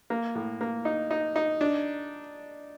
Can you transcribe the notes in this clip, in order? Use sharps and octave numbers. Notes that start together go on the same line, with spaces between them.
A#3
A2
A#3
D#4
D#4
D#4
D4